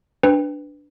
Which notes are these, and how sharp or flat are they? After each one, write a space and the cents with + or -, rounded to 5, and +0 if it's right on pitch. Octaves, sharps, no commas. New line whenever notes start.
D4 +0 B4 +10 G5 +25